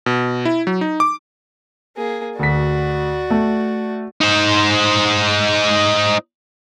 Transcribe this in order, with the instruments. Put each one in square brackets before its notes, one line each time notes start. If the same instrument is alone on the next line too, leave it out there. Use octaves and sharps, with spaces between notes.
[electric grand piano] B2
E4
F#3
D#4
D6
[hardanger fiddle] A#3 G#4
[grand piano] D2 B6 [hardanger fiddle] F#4 D5
[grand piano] A3
[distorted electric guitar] D#4 C5